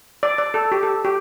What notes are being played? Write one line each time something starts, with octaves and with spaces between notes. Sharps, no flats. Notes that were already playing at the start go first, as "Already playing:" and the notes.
D5
D5
A4
G4
A4
G4